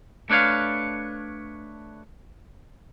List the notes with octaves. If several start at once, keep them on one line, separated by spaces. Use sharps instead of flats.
A3 D4 B4 C#5 F5